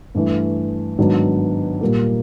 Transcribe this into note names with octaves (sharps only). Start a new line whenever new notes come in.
G2 E3 A3
G#2 D#3 F#3 B3 D4
A#2 G3 A#3